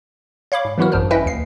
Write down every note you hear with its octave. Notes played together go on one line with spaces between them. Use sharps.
C#5 F5 B5 D6
G#2
E3 F#3 B3 E4 F#4 A#4
G#1 F#2 D#3 D4 C5 F6
C#4 E4 B4 D#5 E5 G5
D#2 C7